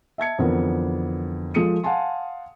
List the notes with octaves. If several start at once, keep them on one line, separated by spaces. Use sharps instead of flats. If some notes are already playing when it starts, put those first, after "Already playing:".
E5 A5 G#6 C#7
F2 D3 E3 B3 A#4
F3 G#3 A4 D#6 C#7 D#7
F5 F#5 G#5 A5 C6